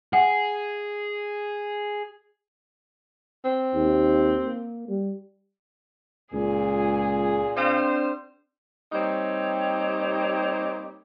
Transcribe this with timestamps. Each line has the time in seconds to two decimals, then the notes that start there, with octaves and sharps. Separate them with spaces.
0.13 G#4 F#5
3.45 C4
3.74 D#2
4.45 A#3
4.88 G3
6.33 C#2 A#2 G#4
7.57 C4 D4 C5 D5
8.92 G3 A#3 C4 D#4 G4 C#5